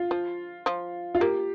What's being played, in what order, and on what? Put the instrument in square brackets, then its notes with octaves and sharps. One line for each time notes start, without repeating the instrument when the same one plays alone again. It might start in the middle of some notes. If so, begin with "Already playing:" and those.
Already playing: [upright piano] F4
[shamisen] F3
F3
[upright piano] F4
[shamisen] A#3 [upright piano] G4